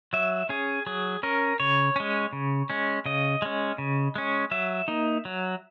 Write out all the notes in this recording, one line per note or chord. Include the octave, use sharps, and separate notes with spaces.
F#3 E5
C#4 G#4
F#3 G#4
C#4 A#4
C#3 C#5
G#3 C#4
C#3
G#3 C#4
C#3 D#5
G#3 C#4
C#3
G#3 C#4
F#3 E5
A#3 D#4
F#3